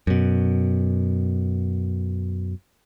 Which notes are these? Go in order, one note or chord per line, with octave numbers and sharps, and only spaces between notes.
F#2 B2